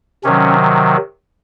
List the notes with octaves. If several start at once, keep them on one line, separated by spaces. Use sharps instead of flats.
C3 D#3 F#3 C#4